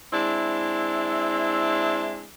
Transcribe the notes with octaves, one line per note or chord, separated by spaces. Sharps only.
G#3 C4 D4 E4